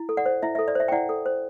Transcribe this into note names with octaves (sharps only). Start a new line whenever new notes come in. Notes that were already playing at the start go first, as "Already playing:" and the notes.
Already playing: E4
A4
D5 F#5
C5
E4 E5
E5
A4
D5
C5 E5
G5
E4 D5 F#5
A4
C5